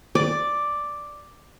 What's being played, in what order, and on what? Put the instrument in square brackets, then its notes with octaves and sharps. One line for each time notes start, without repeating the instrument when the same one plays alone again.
[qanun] D5